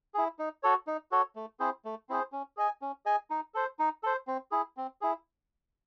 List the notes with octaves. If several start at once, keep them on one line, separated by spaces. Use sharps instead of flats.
E4 G#4
D#4
F#4 A4 C#5
D#4
F#4 A4 C#5
A3
C4 E4 G#4 C5
A3
C4 E4 G#4 C5
C#4
G#4 D#5 G#5
C#4
G#4 D#5 G#5
D#4
A4 C5
D#4
A4 C5
C4
E4 G#4
C4
E4 G#4